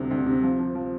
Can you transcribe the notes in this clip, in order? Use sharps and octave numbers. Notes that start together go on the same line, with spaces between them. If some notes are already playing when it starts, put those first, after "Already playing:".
Already playing: D2 C3 G3
D2
C3
F3
F3
F3